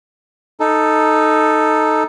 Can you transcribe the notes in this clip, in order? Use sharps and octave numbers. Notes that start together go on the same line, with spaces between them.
D#4 A4